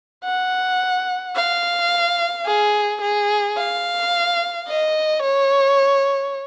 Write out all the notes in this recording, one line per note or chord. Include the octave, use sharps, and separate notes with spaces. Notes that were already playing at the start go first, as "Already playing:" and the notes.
F#5
F5
G#4
G#4
F5
D#5
C#5